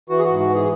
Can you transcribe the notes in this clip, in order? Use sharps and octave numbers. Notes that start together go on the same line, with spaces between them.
E3 F#4
G#4
F#4
G#2
F#4
E3
G#4